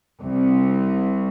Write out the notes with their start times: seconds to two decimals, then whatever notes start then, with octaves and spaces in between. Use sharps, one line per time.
0.21 C2